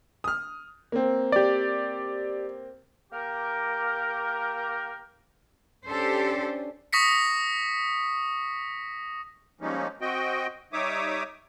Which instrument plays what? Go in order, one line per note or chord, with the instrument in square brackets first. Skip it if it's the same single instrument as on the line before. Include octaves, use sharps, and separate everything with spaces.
[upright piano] D#6 F6
A#3 C4
[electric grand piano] G4 D5
[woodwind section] A#3 G4 A#4
[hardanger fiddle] C#4 D4 [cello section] G4 A4 C5
[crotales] C#6 D#6 A#6 B6 C#7
[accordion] F3 G3 G#3 A#3 C#4 D#4
C4 F#4 D#5 G5
G3 D#4 C#5 E5 D6 D#6